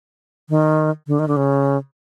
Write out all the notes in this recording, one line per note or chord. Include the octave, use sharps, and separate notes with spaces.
D#3
D3
D#3
D3
C#3